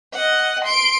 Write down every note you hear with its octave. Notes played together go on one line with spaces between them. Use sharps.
D#5 F#5
C6 D7